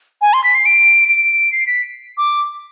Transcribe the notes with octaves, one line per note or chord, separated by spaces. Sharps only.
G#5
C6
B6
C7
D7
D7
C7
B6
D6